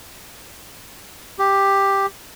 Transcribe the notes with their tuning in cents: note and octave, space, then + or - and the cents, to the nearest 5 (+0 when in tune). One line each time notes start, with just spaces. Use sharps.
G4 +5